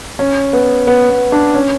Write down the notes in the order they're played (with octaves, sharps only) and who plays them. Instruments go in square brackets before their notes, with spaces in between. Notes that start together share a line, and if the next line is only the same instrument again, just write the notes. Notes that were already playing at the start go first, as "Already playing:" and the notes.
[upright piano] C#4
B3
B3
B3
D4
C#4